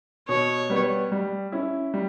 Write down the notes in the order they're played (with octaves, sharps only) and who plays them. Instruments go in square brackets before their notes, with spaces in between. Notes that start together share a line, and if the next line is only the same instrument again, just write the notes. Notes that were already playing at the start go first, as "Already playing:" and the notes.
[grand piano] B2 [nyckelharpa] C#5
[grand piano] G3 B3
G3
C#4 E4
G3